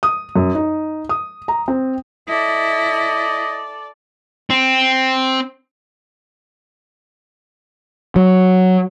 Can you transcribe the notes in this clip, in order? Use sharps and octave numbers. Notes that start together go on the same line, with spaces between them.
D#6
F#2
D#4
D#6
A#5
C4
E4 A4 D5 D#5
C4
F#3